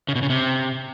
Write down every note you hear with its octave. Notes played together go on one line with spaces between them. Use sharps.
C#3
B2
C#3
C3